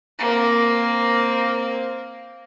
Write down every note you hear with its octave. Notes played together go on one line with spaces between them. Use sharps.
A#3 C4